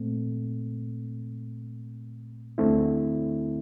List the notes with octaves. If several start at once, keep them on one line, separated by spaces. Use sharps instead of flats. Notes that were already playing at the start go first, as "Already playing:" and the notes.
Already playing: A#2 A3 C4
D2 D3 A3 C4 E4